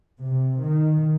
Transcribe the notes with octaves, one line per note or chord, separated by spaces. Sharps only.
C3
D#3